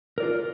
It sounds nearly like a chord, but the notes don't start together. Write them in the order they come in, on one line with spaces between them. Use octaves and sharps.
A#4 D5 F4